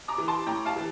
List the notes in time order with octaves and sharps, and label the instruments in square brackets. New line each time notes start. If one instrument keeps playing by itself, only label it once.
[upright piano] A#5 D6
E3
A5 C6
A2 G5 A#5
F5 A5
E3